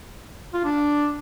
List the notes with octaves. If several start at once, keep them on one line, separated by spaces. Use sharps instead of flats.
F4
D4